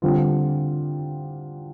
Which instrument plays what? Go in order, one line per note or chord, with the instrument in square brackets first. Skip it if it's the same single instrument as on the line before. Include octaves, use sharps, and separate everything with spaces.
[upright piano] D3 G3 C4 F4